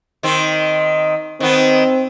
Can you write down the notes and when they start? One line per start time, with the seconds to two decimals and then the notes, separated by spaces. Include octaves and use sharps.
0.23 D#3 C4
1.40 D#3 B3 C4